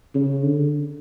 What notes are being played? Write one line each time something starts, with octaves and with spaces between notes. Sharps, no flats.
C#3
D3